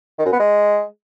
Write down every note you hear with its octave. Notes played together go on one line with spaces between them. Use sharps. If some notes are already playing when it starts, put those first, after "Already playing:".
D#3
F#2
B3
G#3